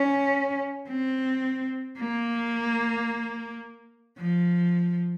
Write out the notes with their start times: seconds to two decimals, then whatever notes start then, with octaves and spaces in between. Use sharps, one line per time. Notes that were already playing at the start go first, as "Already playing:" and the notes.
Already playing: C#4
0.88 C4
1.99 A#3
4.18 F3